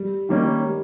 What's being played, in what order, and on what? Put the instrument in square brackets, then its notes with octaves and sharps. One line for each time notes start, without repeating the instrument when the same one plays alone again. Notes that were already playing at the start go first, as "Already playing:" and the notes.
Already playing: [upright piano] G3
[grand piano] D#3 G3 A#3 C#4
[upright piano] G3